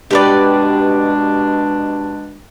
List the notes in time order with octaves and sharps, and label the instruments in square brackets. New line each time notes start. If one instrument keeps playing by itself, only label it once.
[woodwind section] B2 G#3 D4 [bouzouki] G4 B4 D5